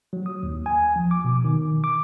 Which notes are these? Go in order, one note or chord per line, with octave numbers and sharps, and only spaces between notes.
F#3
D#6
D#2
G#5
F3
D6
B2
D#3
D6